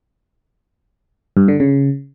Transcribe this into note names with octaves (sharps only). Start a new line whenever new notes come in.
G2
D3
C#3